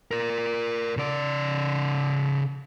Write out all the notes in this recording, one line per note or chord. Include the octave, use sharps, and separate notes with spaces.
A#4 D5
C#3 D5